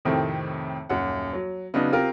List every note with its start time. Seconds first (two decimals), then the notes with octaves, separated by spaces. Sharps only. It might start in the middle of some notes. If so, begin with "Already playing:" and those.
0.05 F2 A2 C3 D#3 A3 C4
0.89 D#1 F#2 F#5
1.33 F#3
1.74 C#3 F#3 B3 D4 D#4
1.93 C4 F4 G4 A#4